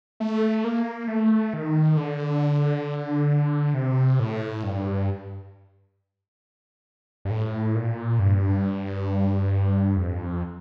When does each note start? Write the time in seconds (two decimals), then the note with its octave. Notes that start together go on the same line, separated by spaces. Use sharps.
0.20 A3
0.64 A#3
1.08 A3
1.53 D#3
1.97 D3
3.74 C3
4.20 A2
4.63 G2
7.25 G2
7.31 A2
7.75 A#2
8.19 G2
9.96 F2